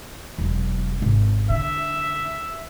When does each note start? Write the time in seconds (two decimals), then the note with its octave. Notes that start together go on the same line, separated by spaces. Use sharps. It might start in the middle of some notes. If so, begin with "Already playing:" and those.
0.38 E1 F#3
1.01 G#1 C3
1.50 D3 E5